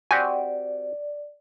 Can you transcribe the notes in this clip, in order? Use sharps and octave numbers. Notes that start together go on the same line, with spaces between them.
C4 F#4 G4 D5 G#5